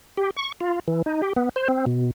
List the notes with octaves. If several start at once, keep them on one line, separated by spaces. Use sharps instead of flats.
G4
C#6
F4
E3
D#4
G4
B3
C5
C4
B2